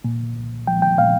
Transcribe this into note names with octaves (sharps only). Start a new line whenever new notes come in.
A#2
C2
F3 G5
G5
A#2 F5